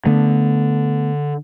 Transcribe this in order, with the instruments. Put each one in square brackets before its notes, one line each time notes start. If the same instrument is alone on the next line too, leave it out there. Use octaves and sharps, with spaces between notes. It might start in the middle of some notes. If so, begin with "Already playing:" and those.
[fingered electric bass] D3 [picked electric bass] A3 B3